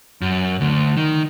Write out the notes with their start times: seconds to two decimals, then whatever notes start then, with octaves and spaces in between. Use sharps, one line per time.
0.21 F#2
0.61 D2
0.97 D#3